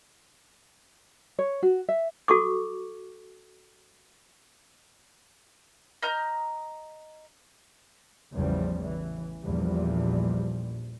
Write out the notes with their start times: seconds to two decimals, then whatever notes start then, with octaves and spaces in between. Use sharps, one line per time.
1.39 C#5
1.63 F#4
1.89 E5
2.28 F#4 A4 C#6 D6
6.03 D#5 A#5 F6 G6
8.33 A1 E2 C#3 F3 G3
8.80 A1 E3
9.44 A#1 E2 A#2 F3 G3